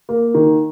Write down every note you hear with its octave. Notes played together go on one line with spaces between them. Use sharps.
A#3
D#3